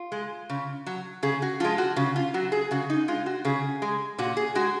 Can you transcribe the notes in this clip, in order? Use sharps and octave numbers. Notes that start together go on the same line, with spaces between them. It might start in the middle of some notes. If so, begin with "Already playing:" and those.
Already playing: F4
G#3
C#3
F#3
C#3 G#4
F#4
F3 G#3 F4
F#4
C#3
F4
F#3 F#4
G#4
C#3 F#4
D#4
G#3 F4
F#4
C#3 G#4
G#3
A#2 F#4
G#4
G#3 F#4